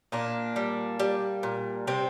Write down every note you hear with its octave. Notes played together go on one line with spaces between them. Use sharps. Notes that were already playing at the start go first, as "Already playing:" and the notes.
A#2 A#3 D4
G3
G3
A#2
C3 C4